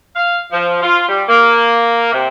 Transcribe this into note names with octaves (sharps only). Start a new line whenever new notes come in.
F5
F3
F4
G3
A#3
C3